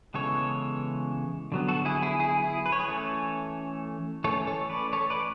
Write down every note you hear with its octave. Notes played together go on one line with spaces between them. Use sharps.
C#3 E3 G#3 B3 A4 C#5
D3 F#3 B3
F#4 A4
E4 G#4
E4 G#4
E4 G#4
E4 G#4
B4
C#5
G#4 B4
E3 A3 C#4 A4 C#5
E3 A3 C#4 A4 C#5
A4 C#5
B4 D5
A4 C#5
B4 D5